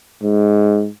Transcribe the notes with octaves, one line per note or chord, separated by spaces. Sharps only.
G#2